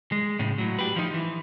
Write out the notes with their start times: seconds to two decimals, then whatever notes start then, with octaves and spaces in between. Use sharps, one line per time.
0.12 G#3
0.39 A2 C#3
0.58 A2 F#3
0.79 G4 B4
0.96 F3 D#4
1.14 E3